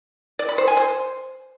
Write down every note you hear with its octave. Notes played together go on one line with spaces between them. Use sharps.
D5
B5
C5
G#5
C5